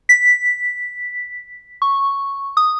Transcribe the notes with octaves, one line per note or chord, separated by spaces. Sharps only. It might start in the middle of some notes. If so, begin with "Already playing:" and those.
B6
C#6
D#6